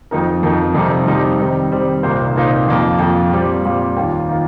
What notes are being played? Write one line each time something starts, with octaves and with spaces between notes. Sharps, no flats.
F2 F3 D#4 A#4
F2 F3 D#4 A#4
F2 C3 G3 D#4
F2 C3 G3 D#4
D#3 G3 C4
D#3 G3 C4
C2 A#2 A#3 D#4 C5
C2 A#2 A#3 D#4 C5
F2 F3 A#3
F2 F3 A#3
A#2 G3 C4
A#2 G3 C4
D#2 D#3 A#3 F4
D#3 A#3 F4